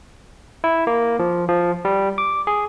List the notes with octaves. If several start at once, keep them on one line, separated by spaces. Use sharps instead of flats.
E4
A#3
F3
F3
G3
D6
G#4